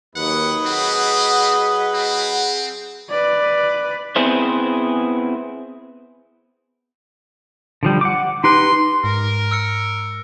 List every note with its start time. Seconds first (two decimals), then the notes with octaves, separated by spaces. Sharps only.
0.16 D#2 F#3 B4 D#5 F#5
0.66 C4 G#4 F#5
1.94 C4
3.10 B4 D5
4.16 B3 C4 E4 G#4 C5
7.83 D3 F3 G3
8.01 F#5 D6
8.44 D#4 G4 B4 C6
9.04 G#2 A#4
9.51 E6 F6 C#7